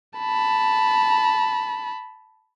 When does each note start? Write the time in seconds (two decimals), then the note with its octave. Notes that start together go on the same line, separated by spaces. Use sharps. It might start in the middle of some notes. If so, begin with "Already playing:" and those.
0.18 A5 B5